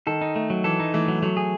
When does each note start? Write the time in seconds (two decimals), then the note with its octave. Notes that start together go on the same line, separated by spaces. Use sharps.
0.06 D#3 A4
0.21 D#4
0.36 A3
0.50 F#3
0.64 E3 A4
0.80 D#4
0.94 E3 A3
1.08 F#3
1.22 F#3 A3
1.37 G#4